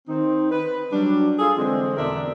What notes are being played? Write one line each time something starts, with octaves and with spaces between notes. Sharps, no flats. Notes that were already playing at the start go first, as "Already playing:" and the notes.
D#3 C4 D#4
B4
F#3 G3 D4
F4 G#4 A4
D3 E3 G#3 C4
E2 B2 D3 D4 A#4 E5